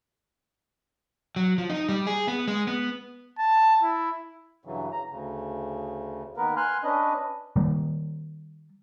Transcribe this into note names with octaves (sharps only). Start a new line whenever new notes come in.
F#3
F3
D#4
G3
G#4
B3
G#3
B3
A5
E4
G2 C#3 E3 F#3
A#5
D2 C#3
D#3 A#3 B3 A#4 B4
G#5 C6 F6 F#6
C#4 D4 B4 D#5
D#3 G3 A#3